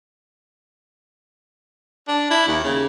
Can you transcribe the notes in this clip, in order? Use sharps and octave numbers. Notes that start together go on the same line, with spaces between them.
D4
E4
D#2
C#3